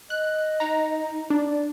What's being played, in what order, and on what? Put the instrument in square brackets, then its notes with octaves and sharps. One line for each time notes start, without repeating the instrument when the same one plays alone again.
[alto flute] D#5 [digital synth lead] F#6
[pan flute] D#4 [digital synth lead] A#5
[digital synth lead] D4 [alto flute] D5